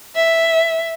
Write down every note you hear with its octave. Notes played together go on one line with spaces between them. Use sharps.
E5